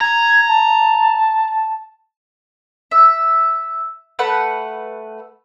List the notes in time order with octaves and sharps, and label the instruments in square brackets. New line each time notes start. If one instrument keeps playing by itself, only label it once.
[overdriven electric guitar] A#5 [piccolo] G#6
[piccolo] A5
[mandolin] E5
A3 B4 F#5 B5